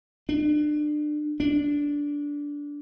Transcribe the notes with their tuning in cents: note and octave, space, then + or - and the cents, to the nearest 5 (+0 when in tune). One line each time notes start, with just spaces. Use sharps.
D4 +30
D4 -15